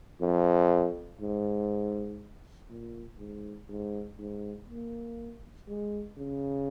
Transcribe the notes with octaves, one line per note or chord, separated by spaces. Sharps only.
F2
G#2
A#2
G#2
G#2
G#2
A#3
G#3
C#3